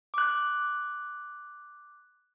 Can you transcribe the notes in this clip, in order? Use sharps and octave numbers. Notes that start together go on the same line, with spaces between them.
D6 F#6